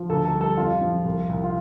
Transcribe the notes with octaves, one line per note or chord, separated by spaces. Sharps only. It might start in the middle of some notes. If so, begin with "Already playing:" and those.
Already playing: F3
D2 A4
A4
G3
A4
F2 F4
F3
C2
C2
F4